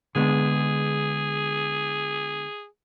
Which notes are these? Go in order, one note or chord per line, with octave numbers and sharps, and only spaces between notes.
D3 G#3 B3 G#4